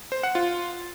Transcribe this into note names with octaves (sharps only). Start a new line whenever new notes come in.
C5
F#5
F4